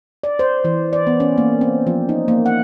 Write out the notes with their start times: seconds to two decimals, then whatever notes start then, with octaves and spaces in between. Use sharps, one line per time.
0.23 D5
0.39 C5
0.64 E3
0.93 D5
1.07 B3
1.20 C#4
1.38 A#3
1.61 C4
1.87 F3
2.09 D#4
2.28 A#3
2.46 F#5